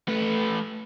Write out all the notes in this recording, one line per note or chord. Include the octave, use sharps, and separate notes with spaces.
A3 B4